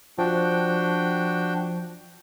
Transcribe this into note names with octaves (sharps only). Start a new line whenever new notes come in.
F3 D4 F#4 G5